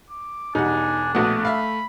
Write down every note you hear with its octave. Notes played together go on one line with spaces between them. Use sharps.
D6
E1 G3 D4 D#4 F#5 G#5
A#1 B2 A3 F#5 D#6
E5 F5 B5